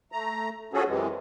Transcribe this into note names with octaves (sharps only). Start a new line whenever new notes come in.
A3 A#5
F3 C#4 F#4 G#4 A4
F#2 C3 E3 G#3